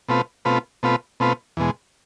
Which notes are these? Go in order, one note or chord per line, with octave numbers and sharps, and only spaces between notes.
B2 A3 C4 F4 B4
B2 A3 C4 F4 B4
B2 A3 C4 F4 B4
B2 A3 C4 F4 B4
E2 B2 G#3